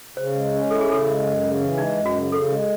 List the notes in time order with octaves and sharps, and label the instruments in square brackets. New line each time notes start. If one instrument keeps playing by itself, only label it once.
[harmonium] C#3 [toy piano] C5
[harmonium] G#3
C#4
[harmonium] E4 [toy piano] A4
[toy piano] G#4
[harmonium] C#3 [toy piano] A4
[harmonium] G#3
F#2
C#3
E3
[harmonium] G#3 [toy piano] D#4
[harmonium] F#2
[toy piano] F#4
[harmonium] C#3
[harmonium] C#3 [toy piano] A4
[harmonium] G#3